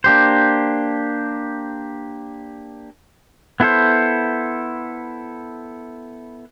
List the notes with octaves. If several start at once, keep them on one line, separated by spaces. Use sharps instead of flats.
A#3 D4 G4 C5
B3 E4 A4 C5